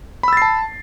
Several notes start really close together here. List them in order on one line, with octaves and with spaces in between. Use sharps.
B5 E6 A6 C7 A5